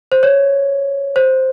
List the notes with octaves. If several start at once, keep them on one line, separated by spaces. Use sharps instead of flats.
C5
C#5
C5